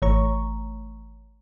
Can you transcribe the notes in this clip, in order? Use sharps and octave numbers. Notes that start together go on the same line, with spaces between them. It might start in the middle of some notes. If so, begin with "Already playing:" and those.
G#1 E3 A3 C#5 A#5 C#6